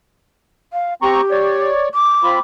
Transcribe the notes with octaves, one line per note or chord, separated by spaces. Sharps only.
F5
C4 G4 A#5 C#6
C#5 D5
D6
C4 F4 B5